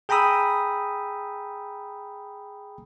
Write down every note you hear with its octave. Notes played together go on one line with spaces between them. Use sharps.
G#4 G5 A#5 B5 D#6 E6